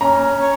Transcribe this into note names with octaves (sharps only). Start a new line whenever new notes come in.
C#4 A#5
C#5